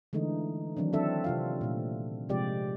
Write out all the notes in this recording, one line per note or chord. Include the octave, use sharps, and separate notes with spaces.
D3 E3 G#3 A3 D#4
D#3 E3 F#3 C4 D4
F#3 C4 D4 A4 E5
C3 F4 F5
A#2 A3
C3 F3 G#3 G4 D5